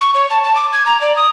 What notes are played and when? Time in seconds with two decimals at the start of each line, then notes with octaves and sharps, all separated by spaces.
0.01 C#6
0.14 C#5
0.30 A5
0.44 A5
0.55 D6
0.73 G#6
0.86 A#5
1.01 D5
1.16 D#6